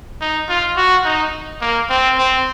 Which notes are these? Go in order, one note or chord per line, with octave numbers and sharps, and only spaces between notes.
D#4
F4
F#4
D#4
A#3
C4
C4